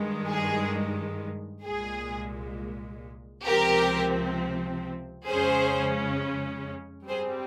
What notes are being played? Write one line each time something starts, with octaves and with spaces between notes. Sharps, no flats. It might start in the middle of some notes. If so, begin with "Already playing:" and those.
Already playing: G2 D#3 G#3
G#4
C2 A#2 G#3 G#4
C#2 C3 F3 C4 G4 A#4
F2 C#3 G#3 C#4 G#4 C5
G2 G3 C4 G#4 C5